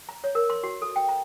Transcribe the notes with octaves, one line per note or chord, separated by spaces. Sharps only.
A#5
C#5
A#4
C6
F#4
A4
G5
A#5